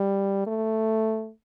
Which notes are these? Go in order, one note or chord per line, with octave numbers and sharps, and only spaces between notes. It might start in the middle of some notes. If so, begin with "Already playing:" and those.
Already playing: G3
A3